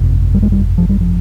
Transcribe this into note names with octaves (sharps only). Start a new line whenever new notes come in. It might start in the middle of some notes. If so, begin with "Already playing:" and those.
Already playing: G1 F2 C3
G3
G#3
G3
F3
G3
F3